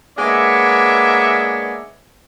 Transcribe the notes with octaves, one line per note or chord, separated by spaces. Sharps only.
G#3 A#3 B3 D4 C#5 E5